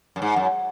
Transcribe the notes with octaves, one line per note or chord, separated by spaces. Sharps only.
F#2
G#2
F#2